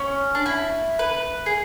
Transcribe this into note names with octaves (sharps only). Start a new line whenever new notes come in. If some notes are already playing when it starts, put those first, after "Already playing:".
Already playing: C#4
D4
E4
B4
G#4